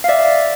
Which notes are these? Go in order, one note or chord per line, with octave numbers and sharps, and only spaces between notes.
F5
D5 E5